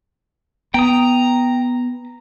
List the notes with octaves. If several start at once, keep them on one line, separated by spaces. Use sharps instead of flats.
B3 G5 A#5 D#6